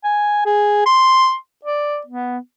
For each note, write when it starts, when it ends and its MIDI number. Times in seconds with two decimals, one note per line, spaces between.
0.04 0.43 80
0.46 0.83 68
0.86 1.35 84
1.65 2.00 74
2.07 2.39 59